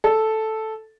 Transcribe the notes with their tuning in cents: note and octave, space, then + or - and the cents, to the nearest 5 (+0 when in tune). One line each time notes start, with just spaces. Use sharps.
A4 -5